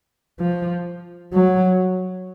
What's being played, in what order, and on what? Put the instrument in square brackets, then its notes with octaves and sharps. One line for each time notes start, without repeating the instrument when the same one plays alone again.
[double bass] F3
F#3